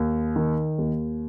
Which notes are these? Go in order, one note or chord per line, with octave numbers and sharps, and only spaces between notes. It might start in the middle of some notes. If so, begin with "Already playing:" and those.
Already playing: D#2
D#3
D#2